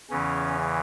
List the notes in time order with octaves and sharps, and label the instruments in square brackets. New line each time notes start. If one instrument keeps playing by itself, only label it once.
[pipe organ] E2 C#3 E3 C#4